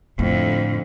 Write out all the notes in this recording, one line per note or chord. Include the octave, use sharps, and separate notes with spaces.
F2 A2 D3